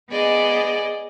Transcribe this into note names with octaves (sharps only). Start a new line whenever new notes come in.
B3 G#4 D5 D#5